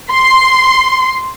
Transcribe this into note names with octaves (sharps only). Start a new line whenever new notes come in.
C6